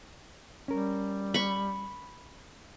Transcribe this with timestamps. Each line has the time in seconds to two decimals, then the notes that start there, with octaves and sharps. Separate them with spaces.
0.68 G3 C#4 A#4
1.34 B5 C#6